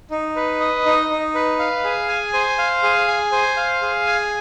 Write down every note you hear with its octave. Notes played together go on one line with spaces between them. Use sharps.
D#4
B4
D#5
D#4
D#4
B4
F5
G#4
G#5
C5
F5
G#4
G#5
C5
F5
G#4
G#5